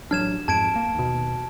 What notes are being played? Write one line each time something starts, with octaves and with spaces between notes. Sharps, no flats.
A1 F#3 D4 F6 G#6 E7
F2 G#2 A5 G#6 D7
A#3
D#2 B2